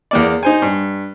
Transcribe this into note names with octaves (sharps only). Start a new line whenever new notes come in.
E2 A#3 D5
D#4 C5 G#5
G2